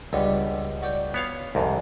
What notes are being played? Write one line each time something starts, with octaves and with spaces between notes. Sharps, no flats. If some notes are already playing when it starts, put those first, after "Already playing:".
C#2 D3 G3 B3
F#4 D5 G5
B3 C#5 F5
C2 F2 G#2